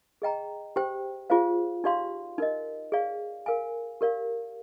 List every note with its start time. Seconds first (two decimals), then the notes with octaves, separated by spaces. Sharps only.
0.22 G#4 D#5 G5 A#5
0.76 G4 C5 G5
1.30 F4 G#4 C5 F5
1.84 D#4 G4 D5 F5 C6
2.38 D#4 A#4 D#5
2.92 G#4 D5 F5
3.46 A#4 F5 G#5
4.01 G4 A#4 D5 F5